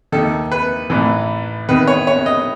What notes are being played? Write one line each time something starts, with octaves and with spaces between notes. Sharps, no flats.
D#2 D#3 A4
B4
A1 A2 E3
E2 D#3 B4
C#5
C#5
D#5